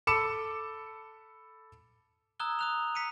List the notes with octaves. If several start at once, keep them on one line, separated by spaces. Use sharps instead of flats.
A4 B5 D6 C#7 E7
A#5 D#6 E6 F#6 G#6 G7
D#6 F#6 F7
B6 C#7 D#7